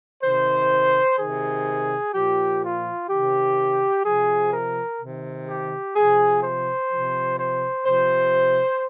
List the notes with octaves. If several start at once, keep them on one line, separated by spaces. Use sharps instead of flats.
C3 D#3 C5
C3 D#3 G#4
A#2 F3 G4
F4
C3 D#3 G4
C3 F3 G#4
A#4
C3 D#3
G4
C3 F3 G#4
C5
C3 F3
C5
C3 F3 C5